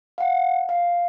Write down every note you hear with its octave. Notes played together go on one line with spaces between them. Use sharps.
F5 F#5
F5